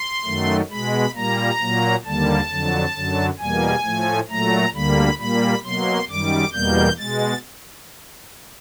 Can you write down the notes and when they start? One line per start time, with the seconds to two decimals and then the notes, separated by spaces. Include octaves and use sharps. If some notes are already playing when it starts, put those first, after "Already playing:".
Already playing: C6
0.25 F#2 D#3 F#3 A3
0.70 B2 G#3 B5
1.14 A#2 G3 A#3 A#5
1.60 A#2 F#3 A#3
2.05 D#2 D3 G3 A#3 A5
2.50 F2 D3 F#3
2.94 F#2 D3 F#3
3.39 E2 B2 G3 A#3 G#5
3.84 A2 F3 A3
4.29 A#2 F#3 A3 A#5
4.73 D2 D3 G3 A#3 B5
5.18 A#2 G3 A#3 B5
5.63 B2 F#3 A#3 C6
6.09 F#2 D#3 G3 D6
6.53 E2 B2 G3 A#3 G6
6.98 B2 G#3 A6